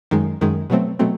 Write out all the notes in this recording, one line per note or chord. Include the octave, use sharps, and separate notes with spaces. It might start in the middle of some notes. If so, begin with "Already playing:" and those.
F#2 D#3 G#3
F#2 D#3 G#3
B2 F#3 A3 C4
B2 F#3 A3 C4